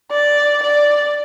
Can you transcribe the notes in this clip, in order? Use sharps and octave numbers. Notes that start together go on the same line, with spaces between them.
D5
D5